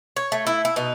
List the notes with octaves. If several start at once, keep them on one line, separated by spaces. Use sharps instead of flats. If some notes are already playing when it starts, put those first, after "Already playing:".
C#5
A3
E4
E4
B2 D#4